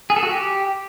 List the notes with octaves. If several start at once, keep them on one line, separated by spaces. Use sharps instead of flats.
G#4
A4
F#4
G4